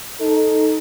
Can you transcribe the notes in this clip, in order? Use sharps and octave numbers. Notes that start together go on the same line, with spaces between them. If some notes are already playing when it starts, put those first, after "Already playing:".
D#4 A4